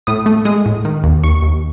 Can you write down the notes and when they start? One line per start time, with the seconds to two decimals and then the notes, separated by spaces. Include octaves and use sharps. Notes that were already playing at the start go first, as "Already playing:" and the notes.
0.07 A2 D#6
0.26 A3
0.45 G#3 D#6
0.66 A2
0.85 D#3
1.04 D#2
1.23 D#2 C#6
1.43 D#2